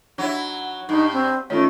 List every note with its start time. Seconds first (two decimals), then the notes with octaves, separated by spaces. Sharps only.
0.18 F#3 D4 E4
0.89 G2 D#4
1.13 C4
1.50 D#3 A3 C#4 F4 C#5